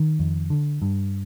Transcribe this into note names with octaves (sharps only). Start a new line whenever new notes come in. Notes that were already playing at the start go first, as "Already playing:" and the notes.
Already playing: D#3
F2
D3
G2